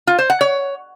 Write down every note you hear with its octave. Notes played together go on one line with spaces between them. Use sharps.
F4
C5
F#5
C#5